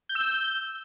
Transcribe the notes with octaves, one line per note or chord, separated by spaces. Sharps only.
G6
E6
G6